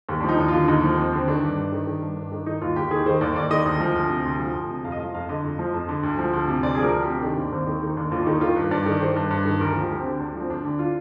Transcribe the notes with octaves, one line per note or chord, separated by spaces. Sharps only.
D#2 G4
D4
F3
D#4
D#2
D3 F4
D#2 D#4
F3
D#2 C4
D3 C4
D#3 D4
G2
G2
D#3
D#3
G2
G2
D#3
D#3 D#4
D#2 F4
D#2 G4
D#3 G#4
D#3 C5
D#2 D5
D#2 D5
D#3 D#5
D2
F3
D2
C3
D2
F3
D2
C3
F2 F5
D#5
F3 F5
F2 F5
D3 D#5
F2
F3
F2
D3
D2
F3
D2
C3
D2 D5
G#4
F3
A#4
D2
C3 G4
D#3 D4
D#2
D#2 C4
D#3
D#3 D#4
D#2 D4
D#2 F4
D4
D#3 D#4
D#3 F4
G2
G2 D5
D#3
D#3 C5
G2
G2
D#3
D2 A#4
F3
G4
D2
C4
D3
D2 D4
F3 C4
D2 D4
D3
F4